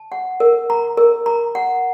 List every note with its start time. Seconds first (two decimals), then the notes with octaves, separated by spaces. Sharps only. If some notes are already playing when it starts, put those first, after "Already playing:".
Already playing: A5
0.12 F#5
0.40 A#4
0.70 A#5
0.97 A#4
1.26 A#5
1.55 F#5